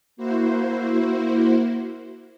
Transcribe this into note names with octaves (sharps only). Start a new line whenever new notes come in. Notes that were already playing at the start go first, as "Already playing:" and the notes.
A#3 E4 F#4 C5